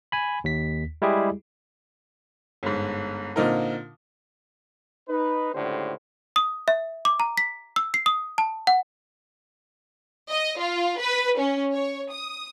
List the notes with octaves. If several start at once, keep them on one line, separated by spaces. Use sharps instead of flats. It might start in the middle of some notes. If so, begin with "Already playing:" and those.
G#5 B5
D#2 B6
G3 G#3 E4 G4 G#4
G1 G#2
A#2 D3 C4 D#4 F4 A#4
D#4 B4
C#2 A2 D3 D4 G4 C5
D#6
E5
D6
A#5
B6
E6
C7
D#6
A5
F#5
D#5
F4
B4
C#4
C#5
D#6